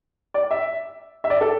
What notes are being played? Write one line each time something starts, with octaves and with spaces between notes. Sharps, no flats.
D5
E5
E5
D5
A4